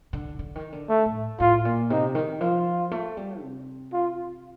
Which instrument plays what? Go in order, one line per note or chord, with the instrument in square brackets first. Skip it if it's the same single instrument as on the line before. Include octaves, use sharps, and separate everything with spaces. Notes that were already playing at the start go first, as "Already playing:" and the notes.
[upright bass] D3
D3
D#3
D3
[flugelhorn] A3
[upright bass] A2
[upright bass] A2 [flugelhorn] F4
[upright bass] A#2
[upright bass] C3 [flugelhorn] D#4
[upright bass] D#3
[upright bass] F3 [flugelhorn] F4
[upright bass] A3
G3
C3
[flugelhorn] F4